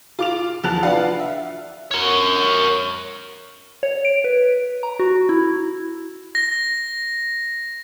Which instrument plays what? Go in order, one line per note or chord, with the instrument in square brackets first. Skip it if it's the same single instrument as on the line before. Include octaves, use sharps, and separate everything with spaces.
[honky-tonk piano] F4 D6 F7
E2 F3 A5 F#6 F7
D4 F4 B4 D5 F5 F#5
E5
[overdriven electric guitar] A#4 C#5
[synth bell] C#5
D7
B4
A#5
F#4
E4
[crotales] A#6